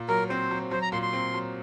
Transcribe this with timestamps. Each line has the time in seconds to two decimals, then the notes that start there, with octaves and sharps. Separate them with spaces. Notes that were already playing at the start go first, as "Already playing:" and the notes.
Already playing: A#2
0.09 F#3 A#4
0.29 C4 C5
0.51 F#3
0.71 F#3 C5
0.82 A#5
0.92 A#2 C6
1.02 C6
1.13 C4
1.34 F#3